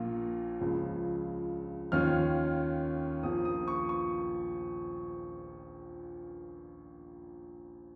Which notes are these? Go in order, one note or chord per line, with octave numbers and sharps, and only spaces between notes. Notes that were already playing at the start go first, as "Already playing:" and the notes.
Already playing: A#1 A#2 A#3 F4
C#2 C#3 F3
D#2 D#3 C#4 F4 F6
A#1 A#2 F3 A#3 D#6
D#6
C#6
C#6